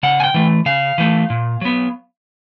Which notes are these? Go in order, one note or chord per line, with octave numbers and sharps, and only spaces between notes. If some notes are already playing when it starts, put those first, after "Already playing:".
C#3 F#5
G#5
G5
E3 A3
C#3 F5
E3 A3
A#2
F#3 B3